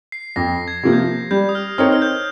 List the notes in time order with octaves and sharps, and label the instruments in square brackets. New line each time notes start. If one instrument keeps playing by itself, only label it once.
[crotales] C7
[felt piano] F2 [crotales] A#6
[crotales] G#6
[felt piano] C3 F3 A#3
[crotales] G6
G#6
[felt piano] G3 [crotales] G6
[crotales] D#6
F6
[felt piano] C4 D#4 A#4 C#5 [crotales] F6
[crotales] F6
G6